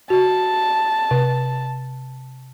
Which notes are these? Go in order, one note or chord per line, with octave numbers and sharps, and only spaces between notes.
F#4 A5
C3